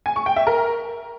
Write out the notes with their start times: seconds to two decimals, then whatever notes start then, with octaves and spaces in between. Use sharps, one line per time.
0.06 G#5
0.16 C#6
0.26 G5
0.36 E5
0.47 A#4